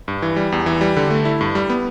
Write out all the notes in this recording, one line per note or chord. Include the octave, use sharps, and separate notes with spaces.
G2
E3
G3
E2
E3
G3
D3
A3
E4
G2
G3
B3